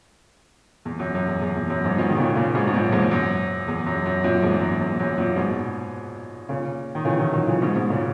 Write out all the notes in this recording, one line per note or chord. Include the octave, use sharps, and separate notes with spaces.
E2
F#2
F#2
E2
E2
E2
F#2
E2 G#2
G#2 B2
D#3
A#2 C#3
A#2 C#3
G#2 B2
G#2
F#2 A#2
E2 G#2
F#2
E2
F#2
F#2
F#2 A#2
E2 G#2
F#2
F#2
E2
F#2
F#2 A#2
G#2 B2
A#2 C#3
D#3
C#3 E3
D#3 F#3
D#3 F#3
C#3 E3
G#2 B2
G#2 B2
A#2 C#3